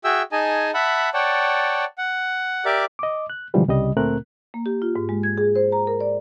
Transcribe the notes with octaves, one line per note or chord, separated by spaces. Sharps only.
F#4 G#4 E5 G5 E6
D#4 G#4 D#5 G#5 A5
E5 F#5 A5 B5
C#5 D5 F#5 G5 A5
F#5
G4 A#4 D5 E5 D6
D#5 D6
F#6
B2 D3 E3 F3 G3 G#3
C2 C#3 G3 D#5
D2 A#2 A3 C4 A#4 F#6
A#3
G4
F4
G#2
G#3
G#6
G#4
C5
A#5
A#4
D5